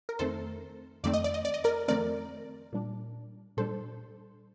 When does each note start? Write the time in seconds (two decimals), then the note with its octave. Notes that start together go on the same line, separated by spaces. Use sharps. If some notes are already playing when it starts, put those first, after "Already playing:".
0.09 A#4
0.19 F2 D#3 A3 C4 A4 C5
1.04 F2 D#3 A3 C4 D5
1.13 D#5
1.24 D5
1.34 D#5
1.45 D5
1.54 D#5
1.64 A#4 D5
1.88 F2 D#3 A3 C4 A#4 D5
2.73 A#2 G3 D4
3.57 A#2 G3 D4 A4 C5